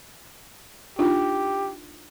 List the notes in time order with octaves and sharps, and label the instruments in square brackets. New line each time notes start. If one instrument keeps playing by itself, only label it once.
[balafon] D4 D#4 F4 [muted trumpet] G4